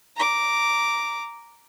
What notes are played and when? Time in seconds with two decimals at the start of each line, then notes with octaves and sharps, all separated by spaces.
0.16 A#5 D6